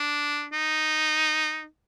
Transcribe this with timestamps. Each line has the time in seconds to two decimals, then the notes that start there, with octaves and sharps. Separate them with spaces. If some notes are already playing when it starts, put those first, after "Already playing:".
Already playing: D4
0.53 D#4